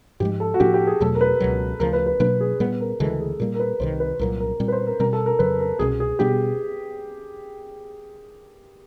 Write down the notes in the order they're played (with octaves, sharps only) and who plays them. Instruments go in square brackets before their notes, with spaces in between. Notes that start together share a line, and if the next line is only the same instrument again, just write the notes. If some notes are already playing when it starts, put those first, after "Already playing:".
[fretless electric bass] G#2 F3 G#3 [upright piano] G4
[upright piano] A4
F#4
[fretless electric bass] A2 F3 A#3 D4 [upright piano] G4
[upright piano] G4
G#4
[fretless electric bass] E2 B2 F#3 A3 [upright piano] A4
[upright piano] A#4
B4
[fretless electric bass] C#2 B2 F#3
[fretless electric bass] D2 C#3 F3 [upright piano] A#4
[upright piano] B4
B4
[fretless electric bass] B2 F#3 A#3 D4 [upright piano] B4
[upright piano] G#4
[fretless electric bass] A#2 G3 B3 [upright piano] B4
[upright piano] A#4
[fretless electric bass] D2 C#3 E3 G#3 [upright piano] A4
[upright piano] G#4
[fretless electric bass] A#2 G3 A#3 [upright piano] A#4
[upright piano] A#4
B4
[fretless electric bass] C2 C3 D#3 [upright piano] C5
[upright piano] B4
[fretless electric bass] C2 A#2 F#3 [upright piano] A#4
[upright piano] A#4
[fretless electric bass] A#2 G3 C4
[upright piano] B4
C5
A#4
[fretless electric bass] B2 G3 C4 [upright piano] A#4
[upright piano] A4
A#4
[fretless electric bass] F2 C#3 F#3 [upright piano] B4
[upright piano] A#4
[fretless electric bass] C2 B2 G#3 C#4 [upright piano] G#4
[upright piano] G#4
[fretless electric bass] B2 G3 B3 D4 [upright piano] G4